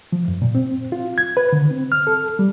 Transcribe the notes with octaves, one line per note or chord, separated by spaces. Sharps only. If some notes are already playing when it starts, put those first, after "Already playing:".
F3
F#2
A#2
C4
F4
G#6
B4
D3
C4
F6
A4
G3